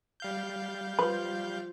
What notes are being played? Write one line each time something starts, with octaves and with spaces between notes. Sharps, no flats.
G3 F5 G6
F3 F4 B4